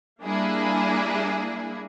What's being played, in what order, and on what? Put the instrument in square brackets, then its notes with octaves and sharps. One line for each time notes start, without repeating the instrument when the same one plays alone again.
[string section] G3 A#3 D4 E4 G#4